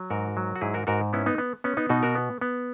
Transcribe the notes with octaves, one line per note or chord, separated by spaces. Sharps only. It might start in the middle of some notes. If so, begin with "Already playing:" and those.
Already playing: F#3
G#2 F#4 A#4
F#3
F#4
G#2 E4 G#4
F#4 A#4
G#2 F#4 A#4
B3 C#4 E4
B3 D#4
B3
B3 C#4
B3 D#4
B2 D#4 F#4
F#4 A#4
B3
B3